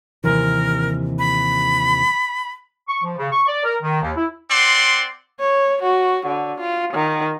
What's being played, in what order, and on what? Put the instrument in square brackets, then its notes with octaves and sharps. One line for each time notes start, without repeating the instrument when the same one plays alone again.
[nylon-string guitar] D#2 C3 E3 [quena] A#4
[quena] B5
[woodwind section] C#6
F3
C#3
C#6
D5
A#4
D#3
D#2
E4
[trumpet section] C4 D5 F#5 C6
[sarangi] C#5
F#4
D3
F4
D#3